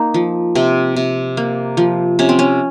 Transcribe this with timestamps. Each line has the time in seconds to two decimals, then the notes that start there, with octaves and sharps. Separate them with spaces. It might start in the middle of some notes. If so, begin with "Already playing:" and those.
Already playing: A#3 D#4
0.14 F3
0.55 C3 C4
0.96 C3
1.37 A#3
1.77 F3
2.19 C3 C#4
2.29 C4
2.39 C#4